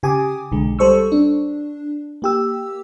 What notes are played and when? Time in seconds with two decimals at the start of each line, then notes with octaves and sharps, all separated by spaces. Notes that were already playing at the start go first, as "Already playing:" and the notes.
0.03 C#3 G4 G#5 D6 D#6
0.52 B1 D3 G#3
0.79 G3 A4 C5 C#6 E6
1.12 D4
2.22 A#3 G4 E6